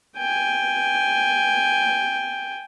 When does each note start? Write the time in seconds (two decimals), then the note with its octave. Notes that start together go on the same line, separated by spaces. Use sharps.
0.17 G5 G#5